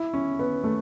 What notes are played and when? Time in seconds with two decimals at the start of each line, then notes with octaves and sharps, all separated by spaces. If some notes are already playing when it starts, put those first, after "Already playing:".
Already playing: E4
0.14 C#4
0.39 B3
0.64 A3